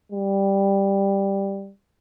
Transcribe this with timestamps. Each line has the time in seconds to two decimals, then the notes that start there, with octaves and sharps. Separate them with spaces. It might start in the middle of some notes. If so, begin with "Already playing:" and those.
0.12 G3